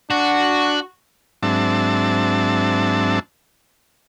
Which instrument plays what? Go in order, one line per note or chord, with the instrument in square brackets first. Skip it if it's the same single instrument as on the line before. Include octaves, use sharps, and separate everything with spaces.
[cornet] D4 [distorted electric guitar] F#4
[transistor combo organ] G#2 F#3 C4 D4 E5 A5